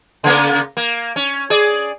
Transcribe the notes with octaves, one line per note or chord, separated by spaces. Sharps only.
C#3 A#3 B3
A#3
C#4
G#4 D5